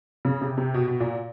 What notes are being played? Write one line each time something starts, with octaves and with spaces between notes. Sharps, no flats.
C#3
C3
C3
B2
B2
A#2